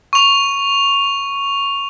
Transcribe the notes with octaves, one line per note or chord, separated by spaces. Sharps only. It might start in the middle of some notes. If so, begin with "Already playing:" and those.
C#6 F7